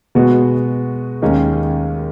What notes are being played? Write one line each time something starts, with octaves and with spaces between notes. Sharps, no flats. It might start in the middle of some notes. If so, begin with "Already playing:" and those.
B2 G#3 B3 F#4
D#2 D#3 G#3 C#4